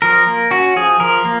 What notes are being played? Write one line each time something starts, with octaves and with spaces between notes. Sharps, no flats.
F3 A#4
A#3
C#4 F#4
F3 G#4
F3 A#4
A#3